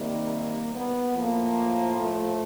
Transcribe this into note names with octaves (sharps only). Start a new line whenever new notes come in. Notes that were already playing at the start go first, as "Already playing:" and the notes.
Already playing: C3 D#3 G3 A#3
B3
A2 F3 A#3
A3